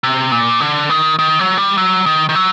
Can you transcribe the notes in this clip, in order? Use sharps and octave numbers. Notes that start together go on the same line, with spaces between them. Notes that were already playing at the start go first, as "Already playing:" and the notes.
C3
A#2
D3
D#3
D#3
F#3
G3
F#3
D#3
D#3
F#3